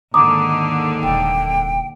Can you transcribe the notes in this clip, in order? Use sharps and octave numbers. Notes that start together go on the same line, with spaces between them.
D#2 G#2 D3 A#5 D6 D#6
D#1 C3 G5